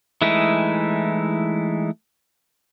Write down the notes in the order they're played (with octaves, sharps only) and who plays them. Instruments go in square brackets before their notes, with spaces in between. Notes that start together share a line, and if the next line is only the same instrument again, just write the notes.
[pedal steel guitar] E3 G#3 A3 D#4 E4